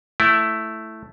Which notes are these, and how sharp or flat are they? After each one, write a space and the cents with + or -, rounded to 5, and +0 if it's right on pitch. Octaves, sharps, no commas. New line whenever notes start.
A3 +0 E4 +0